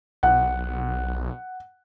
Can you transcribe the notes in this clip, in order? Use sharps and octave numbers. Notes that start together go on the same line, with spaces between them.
B1 F#5